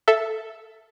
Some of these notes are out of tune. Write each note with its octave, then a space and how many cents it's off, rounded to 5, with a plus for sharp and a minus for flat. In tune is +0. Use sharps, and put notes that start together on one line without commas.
A4 +0 E5 +10